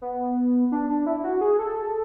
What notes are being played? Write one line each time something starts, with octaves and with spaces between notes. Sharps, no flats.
B3
D4
D4
E4
F#4
G#4
A4